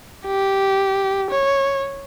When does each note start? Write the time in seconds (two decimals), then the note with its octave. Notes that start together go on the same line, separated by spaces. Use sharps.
0.26 G4
1.31 C#5